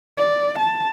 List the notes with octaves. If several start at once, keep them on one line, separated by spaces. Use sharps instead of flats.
D5
A5